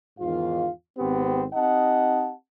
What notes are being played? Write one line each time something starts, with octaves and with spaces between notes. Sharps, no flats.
E2 G#2 D#3 F4 F5
G#1 B3 C4 G4
C4 D#4 G4 D#5 F#5 A5